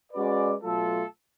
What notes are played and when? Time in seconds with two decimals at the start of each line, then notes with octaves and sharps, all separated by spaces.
0.12 G#3 C#4 F#4 B4 D5
0.62 B2 F#3 A3 F4 A4